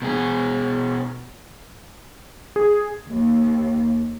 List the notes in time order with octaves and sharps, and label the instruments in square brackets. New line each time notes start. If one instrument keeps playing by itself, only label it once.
[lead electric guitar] B2 G#4
[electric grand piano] G#4
[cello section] D#2